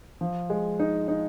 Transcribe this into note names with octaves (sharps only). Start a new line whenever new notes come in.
F3
G#3
D#4
D#4